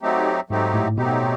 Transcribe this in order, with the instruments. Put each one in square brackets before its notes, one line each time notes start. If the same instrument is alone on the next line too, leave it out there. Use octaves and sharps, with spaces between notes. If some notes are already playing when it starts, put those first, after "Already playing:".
[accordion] F#3 A3 C4 D#4 G4
[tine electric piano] G#2 [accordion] F#3 A3 C4 D#4 G4
[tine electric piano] A2
[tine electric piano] B2 [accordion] F#3 A3 C4 D#4 G4